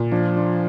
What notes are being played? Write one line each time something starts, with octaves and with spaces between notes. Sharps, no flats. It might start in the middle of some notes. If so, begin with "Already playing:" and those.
Already playing: A#2
F3 D4
D4